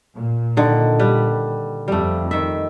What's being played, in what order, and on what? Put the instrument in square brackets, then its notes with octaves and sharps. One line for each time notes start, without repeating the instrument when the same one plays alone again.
[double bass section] A#2
[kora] D3 D#3
G3 B4
[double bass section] F2 [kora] G3 A3
[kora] D#3 E5